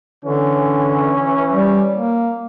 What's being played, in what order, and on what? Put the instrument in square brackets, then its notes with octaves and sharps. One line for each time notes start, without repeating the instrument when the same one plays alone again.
[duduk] D3 [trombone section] E3 C#4
[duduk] G3
A#3